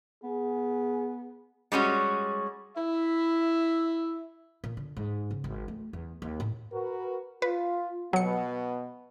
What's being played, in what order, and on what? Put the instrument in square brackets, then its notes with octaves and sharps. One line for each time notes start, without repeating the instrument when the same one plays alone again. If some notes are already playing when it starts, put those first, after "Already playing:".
[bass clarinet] B3 [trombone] G#4
[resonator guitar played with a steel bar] G3 G#3 C#4 F#4
[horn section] E4 E5
[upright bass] A#2
D3
G#2
C#3
G#1
A3
E2
D#2
A2
[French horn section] F#4 A#4 B4
[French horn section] F4 [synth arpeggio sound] B4
[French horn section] B2 B3 [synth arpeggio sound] F#3 C#7